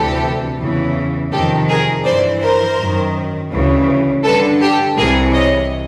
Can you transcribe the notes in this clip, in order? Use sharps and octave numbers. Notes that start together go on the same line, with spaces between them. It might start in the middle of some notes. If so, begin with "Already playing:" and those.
Already playing: D2 C3 E3 G4 A4
E2 C#3 E3
F2 C3 D#3 G4 A4
G#4 A#4
G2 E3 C5 D5
A#4 C5
F#2 D#3
D2 C#3 E3
G2 D3 A4 B4
G4 A4
C2 C3 E3 G#4 A#4
C#5 D#5